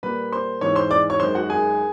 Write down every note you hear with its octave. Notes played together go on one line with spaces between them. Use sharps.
A#2 G3 A#3 B4 B5
C5 C6
G#2 E3 G#3 C#5 C#6
C5 C6
D5 D6
C#5 C#6
F#2 D#3 G#3 C5 C6
F#4 F#5
G#4 G#5